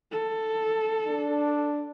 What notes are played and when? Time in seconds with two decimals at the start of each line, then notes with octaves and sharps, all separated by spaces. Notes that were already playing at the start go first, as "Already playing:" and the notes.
0.12 A4
1.07 D4